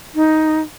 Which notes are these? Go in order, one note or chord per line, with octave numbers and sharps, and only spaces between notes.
D#4